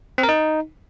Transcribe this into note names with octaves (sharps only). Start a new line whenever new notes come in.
C4
A#4
D#4